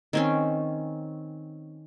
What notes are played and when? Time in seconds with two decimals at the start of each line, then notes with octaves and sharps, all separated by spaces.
0.13 D#3 C4 C#4